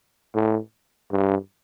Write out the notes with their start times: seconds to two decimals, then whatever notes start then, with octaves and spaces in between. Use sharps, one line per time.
0.35 A2
1.12 G2